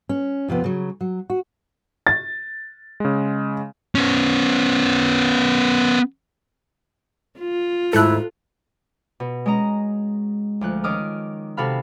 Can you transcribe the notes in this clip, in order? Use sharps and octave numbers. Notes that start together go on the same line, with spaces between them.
C#4
F2 C3 F3 B3
C#3 F#3
F#3
F#4
A6
C#3 G#3
B3 C#4
F4
D#2 G#2 A3 E4 A4 F#6
B2
G#3 C#4 D#5 A#5
D2 F3 F#6
D#3 C#4 D#4 D6 D#6 F6
C3 F#4 A4 F5 B5 F6